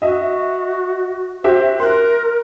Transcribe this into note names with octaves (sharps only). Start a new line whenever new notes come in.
F#4 D#5 E5
F#4 G4 C5 E5
A#4 C6 F#6